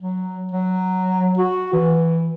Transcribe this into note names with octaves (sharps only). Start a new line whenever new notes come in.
F#3
F#3
F#4
E3